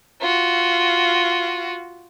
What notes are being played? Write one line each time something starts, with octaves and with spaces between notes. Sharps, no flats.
F4 F#4